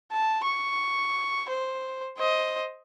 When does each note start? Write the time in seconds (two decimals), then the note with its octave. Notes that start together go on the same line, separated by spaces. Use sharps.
0.12 A5
0.43 C#6
1.49 C5
2.18 C5 D#5